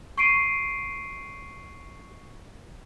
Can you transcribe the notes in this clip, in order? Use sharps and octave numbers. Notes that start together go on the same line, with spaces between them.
C#6 C7 D7 D#7